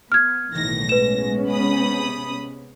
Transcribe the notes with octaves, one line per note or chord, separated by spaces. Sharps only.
B3 F6 G#6
F#1 B1 A2 D#3 E3 A#6
G#3 B3 C#4 B4 E7
C3 B5 D#6